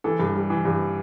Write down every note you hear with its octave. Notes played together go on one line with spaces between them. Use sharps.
E3 A4
G2
G3
E3
G2